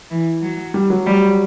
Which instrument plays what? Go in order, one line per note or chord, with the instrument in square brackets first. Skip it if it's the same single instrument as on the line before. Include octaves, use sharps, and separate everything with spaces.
[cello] E3
F#3
[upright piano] G3
F#3
[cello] G3